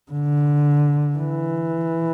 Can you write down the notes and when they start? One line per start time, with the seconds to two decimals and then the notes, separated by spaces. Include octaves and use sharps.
0.11 D3
1.17 E3